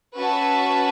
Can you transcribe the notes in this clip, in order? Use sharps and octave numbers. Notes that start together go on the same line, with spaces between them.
C#4 F#4 B4 E5 A5